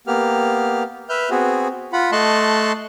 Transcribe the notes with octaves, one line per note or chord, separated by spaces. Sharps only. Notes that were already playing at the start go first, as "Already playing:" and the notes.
A#3 B3 G4 F6
B4 E5 F6 G6
B3 C4 F#4 G#4
F4 F#5 B5
A3 D#5 A5 C6 C#6 F#6